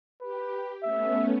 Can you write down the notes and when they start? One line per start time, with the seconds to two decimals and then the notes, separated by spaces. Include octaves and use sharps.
0.21 G4 B4
0.83 A3 B3 C#4 E5